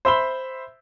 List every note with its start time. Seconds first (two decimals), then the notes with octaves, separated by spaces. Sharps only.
0.05 C5 E5 B5 G7